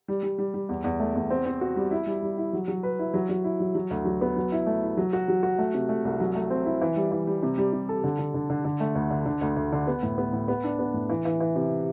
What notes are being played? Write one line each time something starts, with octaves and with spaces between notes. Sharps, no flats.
G3
G3
G3
G3
E2
E2
A3
E2
C4
C4
F#4
G3
E4
G3
G3
E4
F#3
F#3
B4
E4
F#3
F#3
E4
F#3
F#3
D2
F#3
B3
F#3
E4
A3
E4
F#3
F#4
F#3
F#4
A3
C3
A3
C2
F#3
A3
C4
E4
E3
G3
E3
G3
C3
G3
C3
A4
D3
D3
D3
D3
D3
A3
D2
D3
D3
D2
D2
D3
B3
A2
B3
A2
B3
D4
B3
A2
E3
E3
E3
C3